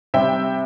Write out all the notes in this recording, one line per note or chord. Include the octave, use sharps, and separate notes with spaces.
C3 G3 C4 E5 G5